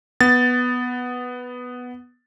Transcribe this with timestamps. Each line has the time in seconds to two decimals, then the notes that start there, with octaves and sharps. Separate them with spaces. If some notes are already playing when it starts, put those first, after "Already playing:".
0.21 B3 A6